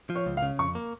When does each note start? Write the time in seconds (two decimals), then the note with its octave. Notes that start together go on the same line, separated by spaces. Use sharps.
0.10 F3
0.15 C#5
0.26 C#2
0.37 F5
0.42 C#3
0.59 F2 C#6
0.75 A#3